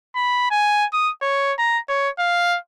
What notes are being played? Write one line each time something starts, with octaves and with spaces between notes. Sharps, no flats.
B5
G#5
D#6
C#5
A#5
C#5
F5